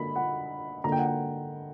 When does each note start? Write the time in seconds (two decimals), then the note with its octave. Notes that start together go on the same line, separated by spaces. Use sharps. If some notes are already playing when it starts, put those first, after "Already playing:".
Already playing: D3 A#3 B5
0.16 F#5
0.84 D3 A#3 A#5
0.92 G5
0.99 F#5
1.06 G5